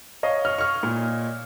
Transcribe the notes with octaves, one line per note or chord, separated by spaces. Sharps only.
C#5 D#5 F5
C#6 F6
C#6 F6
A#2